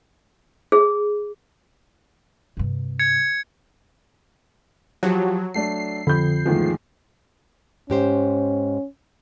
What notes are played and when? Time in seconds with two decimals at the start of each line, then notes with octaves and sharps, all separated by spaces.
0.72 G#4
2.57 G2 C3
2.99 G#6 C#7
5.03 F3 F#3 G4
5.54 F#3 A3 D4 C7
6.07 F2 D3 B5 G6
6.46 E2 G#2 D#3 F3 A3
7.90 G#2 C#4 G4 C5